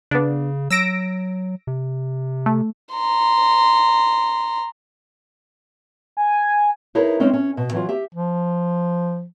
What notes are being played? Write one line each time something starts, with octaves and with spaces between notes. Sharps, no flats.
C#3 B3 D4
F#3 E6 A#6 D7
C3
A3
A#5 C6
G#5
D#4 E4 G#4 A#4 B4 C#5
G#3 C4 C#4 D#4
C#4
B2
E3 F#3 F4
G4 E5
F3